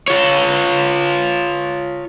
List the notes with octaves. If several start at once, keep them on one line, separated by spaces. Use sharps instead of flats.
F4 C#5